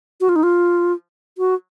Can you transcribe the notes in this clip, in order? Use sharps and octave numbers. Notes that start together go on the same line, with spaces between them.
F#4
F4
D#4
F4
F#4